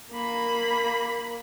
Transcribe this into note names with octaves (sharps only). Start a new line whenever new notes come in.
A#3 B5